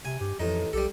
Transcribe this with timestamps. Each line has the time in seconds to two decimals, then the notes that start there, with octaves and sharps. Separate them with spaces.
0.05 C3 G#5
0.21 G2 G4
0.40 A1 F2 A2 F3 D#4
0.73 B1 G3 G4 A4